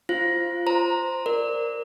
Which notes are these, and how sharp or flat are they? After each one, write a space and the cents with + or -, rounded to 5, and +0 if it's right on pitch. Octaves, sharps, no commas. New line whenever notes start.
F4 -15 C5 +0 F5 +0
C5 -5 A#5 +0
A#4 +0 D5 +0